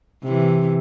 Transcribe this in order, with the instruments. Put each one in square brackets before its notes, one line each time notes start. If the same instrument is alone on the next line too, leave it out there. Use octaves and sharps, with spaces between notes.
[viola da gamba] C3 E3